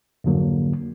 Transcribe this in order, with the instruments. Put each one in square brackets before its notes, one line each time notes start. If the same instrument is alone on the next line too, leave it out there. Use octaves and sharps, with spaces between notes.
[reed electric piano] F2 G#2 D3 F#3 A#3